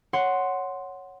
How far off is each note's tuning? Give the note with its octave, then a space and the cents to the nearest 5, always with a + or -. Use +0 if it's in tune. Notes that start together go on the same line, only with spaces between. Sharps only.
C#5 +0 F#5 +0 C6 +0